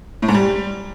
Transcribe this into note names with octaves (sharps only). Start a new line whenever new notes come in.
A2
G#2
G3